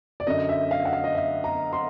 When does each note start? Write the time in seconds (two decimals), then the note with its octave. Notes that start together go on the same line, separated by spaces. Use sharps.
0.20 D5
0.27 F#2 D3 D#5
0.49 E5
0.71 F5
0.85 F#5
0.93 F5
1.04 D#5
1.15 E5
1.44 A#5
1.73 C6